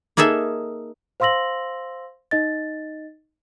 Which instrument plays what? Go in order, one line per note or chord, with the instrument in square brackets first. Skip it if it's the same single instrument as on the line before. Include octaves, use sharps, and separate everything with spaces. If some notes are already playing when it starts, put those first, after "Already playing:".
[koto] A#3 D#4 G#4 A4 E5
[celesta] C5 F5 C6 E6 A#6 F#7
D#4 D#5 A6